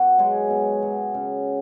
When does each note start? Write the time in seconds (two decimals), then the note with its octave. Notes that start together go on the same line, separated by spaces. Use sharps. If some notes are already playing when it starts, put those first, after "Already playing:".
Already playing: B2 F#4
0.18 F#3 G#3 G#4
0.50 B2
0.82 F#3
1.14 C#3